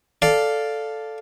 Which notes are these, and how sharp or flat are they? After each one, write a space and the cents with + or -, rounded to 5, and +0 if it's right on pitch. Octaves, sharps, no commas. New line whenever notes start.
A4 +0 D5 +0 F5 +0